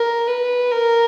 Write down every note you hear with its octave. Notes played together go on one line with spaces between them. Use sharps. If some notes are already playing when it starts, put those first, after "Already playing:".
Already playing: A#4
B4
A#4